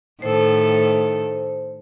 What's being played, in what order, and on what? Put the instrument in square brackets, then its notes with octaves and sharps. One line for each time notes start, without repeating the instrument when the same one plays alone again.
[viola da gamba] A2 D#3 A4 [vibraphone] C5